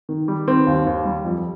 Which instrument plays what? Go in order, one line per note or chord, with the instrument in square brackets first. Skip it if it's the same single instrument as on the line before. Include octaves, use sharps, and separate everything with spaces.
[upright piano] D#3
G3
D#3 C4
D#2
D#2
G3
F2